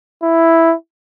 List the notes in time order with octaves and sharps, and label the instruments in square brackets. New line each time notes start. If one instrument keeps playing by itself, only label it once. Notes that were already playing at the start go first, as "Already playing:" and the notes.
[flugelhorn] E4